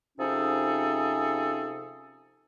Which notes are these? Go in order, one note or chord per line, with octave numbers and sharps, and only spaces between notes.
C3 F3 C#4 D#4 G#4 A4